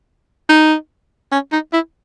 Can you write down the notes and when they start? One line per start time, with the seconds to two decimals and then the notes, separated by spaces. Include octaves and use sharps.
0.49 D#4
1.32 C#4
1.52 D#4
1.73 E4